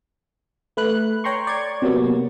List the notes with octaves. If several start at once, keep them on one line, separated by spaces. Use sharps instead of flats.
A3 B4 F#6
C#5 G5 A#5 C6 C#6
D5 C#6 G#6
C3 F#3 A#3 B3